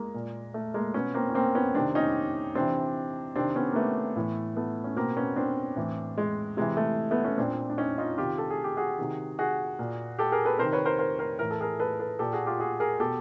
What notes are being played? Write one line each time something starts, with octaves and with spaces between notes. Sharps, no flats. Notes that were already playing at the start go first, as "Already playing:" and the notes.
Already playing: G#3 A#3
A#2
A3
G#3 A#3
B2 B3 C#4
A#3 C4
C#4
A#3 C4
B3 C#4
C3 D#3 C4 D4
C#4 D#4
C3 E3 C4 D4
C3 D#3 C4 D4
B3 C#4
A#3
A3 B3
A2 E3
A3 B3
C#4
B2 A#3 C4
B3 C#4
C4 D4
A2 E3
G#3
C3 E3 G#3
A3
A3 B3
B3 C#4
A#2 C4 D4
D4
C#4 D#4
D#4 F4
C3 D#3 F4 G4
A4
G#4
G4
F#4 G#4
C3 D#3
F#4 G#4
A#2
G4 A4
G#4 A#4
A4 B4
C3 D#3 A#4 C5
B4 C#5
A#4 C5
A#4 C5
A#4 C5
A2 E3 A#4
A4
G#4 A#4
A4 B4
A4 B4
A#2 G4 A4
F#4 G#4
F4 G4
F#4 G#4
G#4 A#4
B2 G4 A4